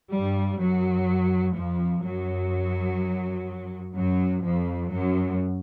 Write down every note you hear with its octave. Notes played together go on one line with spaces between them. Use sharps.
G2 G3
F#2 F#3
F2 F3
F#2 F#3
F#2 F#3
F2 F3
F#2 F#3